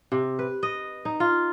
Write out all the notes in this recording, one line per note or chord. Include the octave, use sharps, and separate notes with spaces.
C3
B4
D#5
D#4
F4